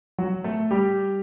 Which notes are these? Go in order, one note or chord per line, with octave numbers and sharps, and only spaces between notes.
F#3 F#4
A3 A4
G3 G4